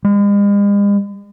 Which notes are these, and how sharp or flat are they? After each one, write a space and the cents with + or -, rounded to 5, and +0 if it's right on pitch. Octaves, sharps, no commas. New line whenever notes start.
G#3 -45